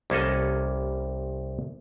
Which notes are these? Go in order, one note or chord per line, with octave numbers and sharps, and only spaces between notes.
C2 A#3 C#4 A4 D#5